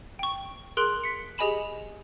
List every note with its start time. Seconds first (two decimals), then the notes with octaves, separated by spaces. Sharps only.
0.19 G5 C#6
0.77 G#4 A#4 C6 F#6 D7 F#7
1.04 B6 C#7
1.38 G4 G#4 D#5 G#5 B5 E7